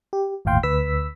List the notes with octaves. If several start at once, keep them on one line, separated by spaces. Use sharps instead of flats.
G4
G1 D#2 A2 F5 G5 C6
D2 B4 E6 B6